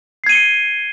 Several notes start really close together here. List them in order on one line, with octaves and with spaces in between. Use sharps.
C7 G#6 D#7 G7 C#7